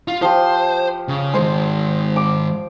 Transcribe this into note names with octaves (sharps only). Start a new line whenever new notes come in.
F4
F3 G4 C5
C#3
D#3 G#3 C5 C6
D6